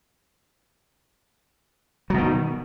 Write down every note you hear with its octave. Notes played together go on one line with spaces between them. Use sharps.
B2 D#3 F#3